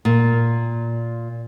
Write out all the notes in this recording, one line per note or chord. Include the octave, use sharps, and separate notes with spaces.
A#2